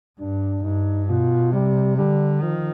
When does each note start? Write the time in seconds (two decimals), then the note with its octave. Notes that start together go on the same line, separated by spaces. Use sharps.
0.19 G2 D4
0.63 G2 D#4
1.09 B2 F4
1.53 C3 G3
1.98 D3 G3
2.42 D#3 F3